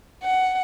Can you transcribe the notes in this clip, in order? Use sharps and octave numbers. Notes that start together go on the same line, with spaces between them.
F#5